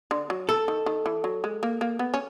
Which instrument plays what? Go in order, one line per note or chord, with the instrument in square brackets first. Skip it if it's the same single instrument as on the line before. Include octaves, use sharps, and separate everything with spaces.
[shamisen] D3
F#3
[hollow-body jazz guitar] A4
[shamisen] D#3
D#3
E3
F#3
G#3
A#3
A#3
B3
C#4